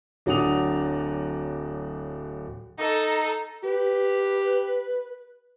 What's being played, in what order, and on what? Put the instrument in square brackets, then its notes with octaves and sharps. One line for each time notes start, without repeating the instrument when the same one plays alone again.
[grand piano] D1 F#3 D4 F#5 D#6 F7
[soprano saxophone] D#4 [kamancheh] A4 A#5
[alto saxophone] G4 [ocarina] B4